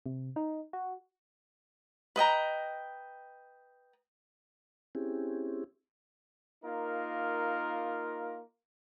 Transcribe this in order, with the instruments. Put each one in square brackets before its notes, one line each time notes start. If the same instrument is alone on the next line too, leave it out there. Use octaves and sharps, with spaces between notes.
[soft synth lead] C3
D#4
F#4
[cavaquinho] B4 D#5 G5 A#5
[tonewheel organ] C4 C#4 E4 G4 G#4
[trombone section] A#3 D#4 F4 A#4